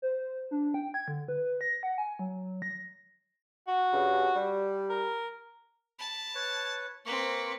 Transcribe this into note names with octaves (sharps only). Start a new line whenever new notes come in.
C5
D4
G5
G#6
D3
B4
A#6
F#5
G#5
F#3
A#6
F#4
G2 C#3
G3
A#4
A5 B5
B4 C#5
A#3 C4 B4 C#6